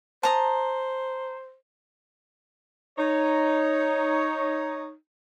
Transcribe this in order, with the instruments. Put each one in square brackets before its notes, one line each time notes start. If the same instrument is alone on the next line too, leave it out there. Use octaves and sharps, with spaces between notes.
[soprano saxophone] C5 [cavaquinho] A5 A#5 D#6
[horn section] D#4 C#5